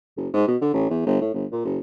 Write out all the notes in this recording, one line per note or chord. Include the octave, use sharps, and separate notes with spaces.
F#1
G#2
B2
D3
A1
E2
G1
A2
G1
A#2
F#1